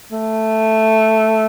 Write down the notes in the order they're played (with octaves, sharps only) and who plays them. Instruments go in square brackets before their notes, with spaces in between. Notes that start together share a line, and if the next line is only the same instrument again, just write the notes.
[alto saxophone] A3